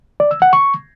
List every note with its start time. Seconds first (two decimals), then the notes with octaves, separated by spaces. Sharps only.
0.20 D5
0.31 E6
0.42 F#5
0.53 C#6